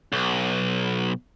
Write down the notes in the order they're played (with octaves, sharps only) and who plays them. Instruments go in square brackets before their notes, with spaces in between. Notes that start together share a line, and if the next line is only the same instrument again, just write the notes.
[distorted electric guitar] B1